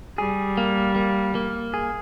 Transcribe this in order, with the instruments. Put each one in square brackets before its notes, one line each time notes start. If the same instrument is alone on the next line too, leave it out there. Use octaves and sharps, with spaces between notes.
[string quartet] G3 [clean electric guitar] G#4
[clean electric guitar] A#3
A#3
A#3
G#4